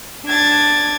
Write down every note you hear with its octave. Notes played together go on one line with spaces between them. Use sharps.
D4 G#6 A6